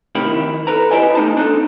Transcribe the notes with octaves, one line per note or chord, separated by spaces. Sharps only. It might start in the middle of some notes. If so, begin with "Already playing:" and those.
A2 C3 D#3 G4 A#4 B5
D#3 E4
A4 B4 A#5
E4 G4 C5 D5 D#5 G#5
A3 D#4 A5
D4 D#4 A4